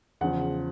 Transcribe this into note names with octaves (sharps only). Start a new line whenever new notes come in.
E2 C#3 F3 F#5